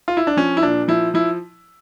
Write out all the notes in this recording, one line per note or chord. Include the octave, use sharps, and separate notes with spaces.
F4
E4
D4
F3 C#4
E4
A#2 D4
F3 E4
F3 E4